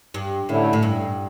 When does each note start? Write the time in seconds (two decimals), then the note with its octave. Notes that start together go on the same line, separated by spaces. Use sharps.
0.14 G2
0.48 D2 A2 D3 A3 C#4 E4
0.73 A2
0.83 G2